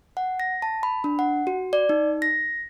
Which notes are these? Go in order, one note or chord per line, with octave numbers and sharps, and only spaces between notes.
F#5
A#6
A5
B5
D4
F#5
F#4
D5
D#4
A#6